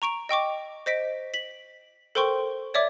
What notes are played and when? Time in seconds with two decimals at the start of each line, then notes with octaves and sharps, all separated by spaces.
0.02 A#5 C#6 D7 F7
0.29 D#5 G5 C#6 D6
0.86 C5 D#5 B6 D7
1.34 B6 F#7
2.15 A4 A#4 C5 G5 C6 C#6
2.74 C#5 D5 E5 D6